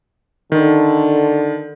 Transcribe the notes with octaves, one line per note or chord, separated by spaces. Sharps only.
D3 D#3